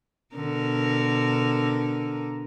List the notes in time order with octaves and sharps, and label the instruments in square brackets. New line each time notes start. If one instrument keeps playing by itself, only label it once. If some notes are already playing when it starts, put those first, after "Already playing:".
[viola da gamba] B2 D3 A#4